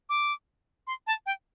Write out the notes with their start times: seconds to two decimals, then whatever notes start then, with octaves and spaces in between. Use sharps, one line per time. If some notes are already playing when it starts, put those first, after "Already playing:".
0.09 D6
0.87 C6
1.07 A5
1.26 G5